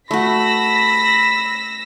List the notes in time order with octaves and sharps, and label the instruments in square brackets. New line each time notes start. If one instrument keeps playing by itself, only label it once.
[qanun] A3 F#4 [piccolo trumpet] B5 [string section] E6 A#6 B6